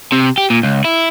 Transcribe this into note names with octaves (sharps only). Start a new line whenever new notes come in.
C3
G4
A#2
C#2
E4